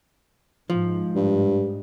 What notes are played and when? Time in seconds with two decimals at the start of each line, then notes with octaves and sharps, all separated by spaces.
0.70 G#2 F3
1.15 G2